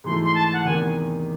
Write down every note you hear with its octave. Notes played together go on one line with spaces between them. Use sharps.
G#2 E3 A3 C6
C6
A5
F#5
E2 C3 D#3 G#5